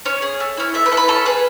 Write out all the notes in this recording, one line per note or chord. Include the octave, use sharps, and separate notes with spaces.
C#4 C#5
G#4
A3
C#4 E4
A3 E5
B4
E4 A4
B4
C#4 A4
G#4 B4